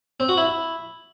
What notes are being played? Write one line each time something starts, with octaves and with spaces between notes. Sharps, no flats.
C4
F#4
E4